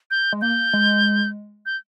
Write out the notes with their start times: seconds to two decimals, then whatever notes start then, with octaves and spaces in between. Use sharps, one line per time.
0.11 G6
0.33 G#3
0.42 A#3 G6
0.74 G#3
1.66 G6